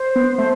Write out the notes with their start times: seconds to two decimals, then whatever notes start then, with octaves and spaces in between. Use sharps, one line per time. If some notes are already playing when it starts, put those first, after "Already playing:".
Already playing: C5
0.16 B3
0.38 A3